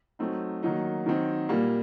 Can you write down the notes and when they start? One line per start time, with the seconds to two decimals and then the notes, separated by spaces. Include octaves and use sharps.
0.19 F#3 A3 C4 D#4
0.63 D#3 F#3 A#3 D#4
1.06 D#3 F#3 C4 D#4
1.49 A#2 G3 A#3